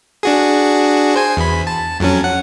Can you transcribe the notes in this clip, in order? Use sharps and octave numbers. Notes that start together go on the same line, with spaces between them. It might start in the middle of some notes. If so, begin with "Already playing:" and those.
D4 F#4 G#4
C5 G#5
E2 B5
A5
F2 F#3 C#4
F#5